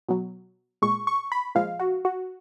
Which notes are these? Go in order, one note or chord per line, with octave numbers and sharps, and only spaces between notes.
B2 F#3
A#2 G#3 C#6
C#6
B5
A#2 F3 G#3 F5
F#4
F#4